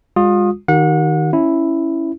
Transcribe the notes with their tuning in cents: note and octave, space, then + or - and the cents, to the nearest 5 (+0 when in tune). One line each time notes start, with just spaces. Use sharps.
G#3 -40 F4 +30 D#6 -10
D#3 +0 G4 -40 F#5 -35
C#4 +0 E4 +0